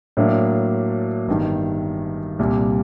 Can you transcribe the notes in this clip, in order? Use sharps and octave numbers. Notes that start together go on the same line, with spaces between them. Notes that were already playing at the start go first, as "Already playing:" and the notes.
A2 F#3 A#3 D4
G1 G2 D#3
C2 A#2 G3